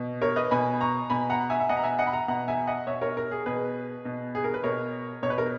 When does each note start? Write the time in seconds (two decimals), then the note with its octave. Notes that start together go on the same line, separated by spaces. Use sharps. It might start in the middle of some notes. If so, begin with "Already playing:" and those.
Already playing: B2
0.22 A#4 C#5
0.36 B4 D#5
0.51 B2 G#5 B5
0.81 A#5 C#6
1.10 B2 G#5 B5
1.30 F#5 A#5
1.50 E5 G#5
1.60 E5
1.69 B2 D#5 F#5
1.77 A#5
1.83 E5 G#5
1.98 D#5 F#5
2.07 B5
2.13 F#5 A#5
2.28 B2 F#5 A#5
2.48 E5 G#5
2.67 D#5 F#5
2.87 B2 C#5 E5
3.02 A#4 C#5
3.17 A#4
3.31 G#4
3.46 B2 G#4 B4
4.05 B2
4.35 G#4
4.44 A#4
4.54 B4
4.64 B2 A#4 C#5
5.23 B2 C#5
5.30 B4
5.38 A#4